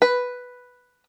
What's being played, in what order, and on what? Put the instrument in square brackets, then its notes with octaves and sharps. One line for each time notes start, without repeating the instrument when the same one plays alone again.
[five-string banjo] B4